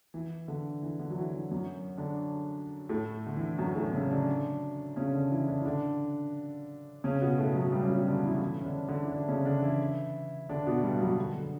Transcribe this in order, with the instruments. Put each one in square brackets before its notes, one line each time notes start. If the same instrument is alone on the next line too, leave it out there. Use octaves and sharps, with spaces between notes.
[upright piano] E3
D3
E3
D3
F#3
E3
E3
F#2 F#3
D3 D4
A2 A3
D3
E3
F#2 F#3
A2 A3
C#3 C#4
D3 D4
C#3 C#4
D3 D4
E3 E4
D3 D4
E4
D3 D4
C#3 C#4
B2 B3
A2 A3
F#2 F#3
G2 G3
C#4
B2 B3
D3 D4
E3 E4
E3 E4
C#4
D3 D4
D3 D4
E4
D3 D4
C#3 C#4
D3 D4
E3 E4
D3 D4
B2 B3
G2 G3
F#2 F#3
D3
D3